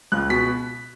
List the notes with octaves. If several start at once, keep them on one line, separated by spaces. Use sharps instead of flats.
C#2 F#6
B2 B6